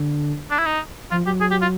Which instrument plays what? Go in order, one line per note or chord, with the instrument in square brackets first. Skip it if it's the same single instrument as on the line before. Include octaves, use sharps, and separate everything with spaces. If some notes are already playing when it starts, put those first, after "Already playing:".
Already playing: [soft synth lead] D3
[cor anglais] D4
E4
D#4
[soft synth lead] F3 [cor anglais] F4
[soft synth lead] F#3 [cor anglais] G4
[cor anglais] G#4
G4
F4